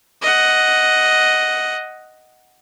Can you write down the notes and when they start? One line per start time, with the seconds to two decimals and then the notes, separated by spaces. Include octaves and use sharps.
0.22 D#5 F#5